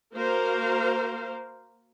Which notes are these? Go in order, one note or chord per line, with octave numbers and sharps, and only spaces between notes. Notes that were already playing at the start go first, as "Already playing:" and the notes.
A#3 F#4 A#4 C5 F5